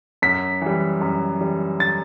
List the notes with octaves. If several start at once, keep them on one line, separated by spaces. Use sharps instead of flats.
F#2 B6
E3 G3
F#2
E3 G3
A6